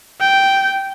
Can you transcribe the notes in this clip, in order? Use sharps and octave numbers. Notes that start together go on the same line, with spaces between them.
G5